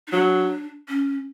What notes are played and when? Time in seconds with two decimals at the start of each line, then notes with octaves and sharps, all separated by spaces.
0.07 D#4
0.11 F#3 D4
0.89 C#4